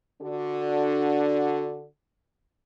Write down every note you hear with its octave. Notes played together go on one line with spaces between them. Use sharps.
D3 D4 F#4